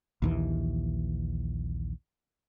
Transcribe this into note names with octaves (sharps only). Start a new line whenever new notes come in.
A#1 D#2 E3